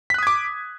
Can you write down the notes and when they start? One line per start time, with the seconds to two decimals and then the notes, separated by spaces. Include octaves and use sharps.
0.10 B6
0.14 F#6
0.18 D#6
0.23 G#6
0.27 D6